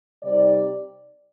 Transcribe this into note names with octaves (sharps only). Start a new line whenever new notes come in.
C3 G3 C4 D#4 D5